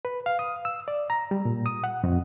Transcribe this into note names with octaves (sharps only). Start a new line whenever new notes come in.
B4
F5
D#6
E6
D5
A#5
G3
A#2
D#6
F#5
F2